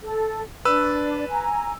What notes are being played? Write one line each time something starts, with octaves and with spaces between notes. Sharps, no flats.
A4
D4 B4 D5 E6
G#5 A#5